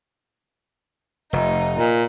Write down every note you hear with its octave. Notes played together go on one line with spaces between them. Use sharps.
F1 D#4
A#2